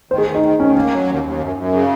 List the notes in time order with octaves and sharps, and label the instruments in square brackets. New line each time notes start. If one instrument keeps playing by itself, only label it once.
[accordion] D#3 [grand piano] C5
[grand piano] G#4
[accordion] D#3
[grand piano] D#4
[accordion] D#3
[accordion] D#3 [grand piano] C#4
[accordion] A#3 [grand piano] C#4
[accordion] F#3
D#2
D#2
F#2
F#2
C#3